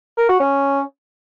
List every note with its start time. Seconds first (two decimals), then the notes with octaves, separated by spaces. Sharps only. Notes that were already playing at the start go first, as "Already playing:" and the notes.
0.18 A#4
0.29 F#4
0.40 C#4